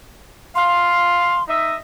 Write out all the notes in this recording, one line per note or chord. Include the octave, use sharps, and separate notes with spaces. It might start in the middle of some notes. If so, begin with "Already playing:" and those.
F5 C6
D#4 D#5 E5